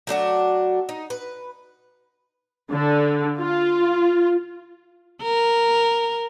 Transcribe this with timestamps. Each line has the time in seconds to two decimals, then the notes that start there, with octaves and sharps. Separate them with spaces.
0.07 F#3 A3 D4 F#4
0.89 D#4
1.10 B4
2.71 D3
3.39 F4
5.22 A#4